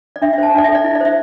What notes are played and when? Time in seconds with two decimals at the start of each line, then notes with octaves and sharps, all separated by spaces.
0.16 D5
0.22 D4 E5
0.33 E5
0.38 C5 A5
0.54 D4 D5
0.64 A4 E5
0.75 D5
0.84 E4
0.95 D5
1.01 C5 E5